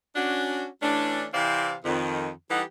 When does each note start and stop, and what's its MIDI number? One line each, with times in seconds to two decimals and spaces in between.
0.16 0.66 61
0.16 0.66 62
0.16 0.66 66
0.82 1.25 52
0.82 1.25 57
0.82 1.25 61
0.82 1.25 62
1.34 1.74 48
1.34 1.74 52
1.34 1.74 60
1.34 1.74 74
1.34 1.74 77
1.85 2.30 41
1.85 2.30 51
2.51 2.62 52
2.51 2.62 55
2.51 2.62 63
2.51 2.62 67
2.51 2.62 69
2.51 2.62 78